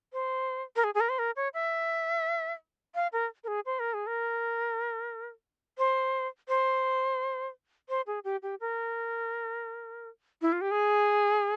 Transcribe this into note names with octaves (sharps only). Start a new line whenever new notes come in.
C5
A#4
G#4
G#4
A#4
C5
A#4
C#5
E5
F5
A#4
A#4
G#4
C5
A#4
G#4
A#4
C5
C5
C5
G#4
G4
G4
A#4
E4
F4
G4
G#4